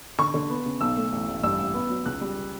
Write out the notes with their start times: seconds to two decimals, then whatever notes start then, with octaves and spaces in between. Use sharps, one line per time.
0.19 D3 C#6
0.34 D3
0.50 B3
0.66 C#3
0.81 B1 E6
0.97 A3
1.12 A1
1.28 A1
1.43 G2 E6
1.59 A1
1.74 B3
1.89 F#3
2.06 C#2 F#6
2.21 G3